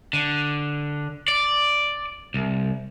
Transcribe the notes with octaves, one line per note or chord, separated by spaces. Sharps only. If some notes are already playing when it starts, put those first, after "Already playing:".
D3
D5
C2